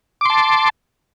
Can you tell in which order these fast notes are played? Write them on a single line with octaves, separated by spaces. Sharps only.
D6 C6 A5